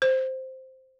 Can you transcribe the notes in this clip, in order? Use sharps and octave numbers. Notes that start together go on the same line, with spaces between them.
C5